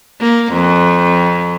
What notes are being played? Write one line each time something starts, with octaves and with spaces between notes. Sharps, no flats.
A#3
F2